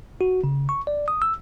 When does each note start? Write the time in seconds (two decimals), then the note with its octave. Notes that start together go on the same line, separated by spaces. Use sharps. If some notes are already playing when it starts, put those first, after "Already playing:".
0.21 F#4
0.44 C#3
0.69 C#6
0.87 D5
1.08 D#6
1.22 E6